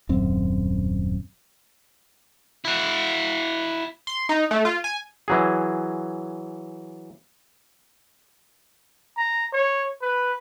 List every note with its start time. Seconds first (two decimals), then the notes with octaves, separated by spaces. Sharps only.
0.09 D#1 F#2 C4
2.65 E4 F#4
4.07 C6
4.29 D#4
4.51 A3
4.65 F4
4.84 G#5
5.28 E3 F#3 G#4
9.17 A#5
9.53 C#5
10.02 B4